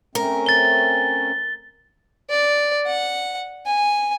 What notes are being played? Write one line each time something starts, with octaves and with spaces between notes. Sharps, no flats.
A3 C4 C#4 A#4
A6 G7
D5
F#5
G#5